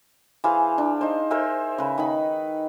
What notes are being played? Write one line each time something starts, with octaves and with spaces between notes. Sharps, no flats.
E3 G#4 C5 F5
D4
D#4 C5
A#4 C5 E5 G#5
C#3 B4
D#3 D#4 B5